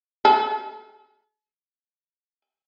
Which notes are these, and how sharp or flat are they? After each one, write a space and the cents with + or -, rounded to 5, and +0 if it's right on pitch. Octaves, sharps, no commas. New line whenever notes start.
A4 -45